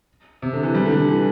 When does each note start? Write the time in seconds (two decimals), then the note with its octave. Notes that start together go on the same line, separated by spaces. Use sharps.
0.42 C3
0.53 D3
0.63 E3
0.74 G3
0.86 D3
0.96 D3
1.09 E3